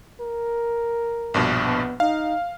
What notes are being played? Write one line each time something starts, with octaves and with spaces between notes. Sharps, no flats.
A#4
A#1 G2 B2
B3
D#4 F5